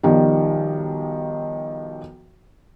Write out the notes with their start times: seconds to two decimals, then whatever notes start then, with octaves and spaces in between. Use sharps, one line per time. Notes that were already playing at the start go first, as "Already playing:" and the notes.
0.03 B1 D#3 F3 G3